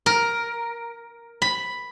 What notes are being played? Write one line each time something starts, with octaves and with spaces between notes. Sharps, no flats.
A#4
B5